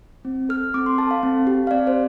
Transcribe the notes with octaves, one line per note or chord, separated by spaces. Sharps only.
C4
A4 F6
C4 D6
C6
A4 A5
F5
C4
G4
F5
C4 D5
C5